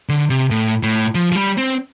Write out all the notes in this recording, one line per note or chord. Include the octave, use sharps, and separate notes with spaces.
D3
C3
A2
A2
F3
F3
G3
C4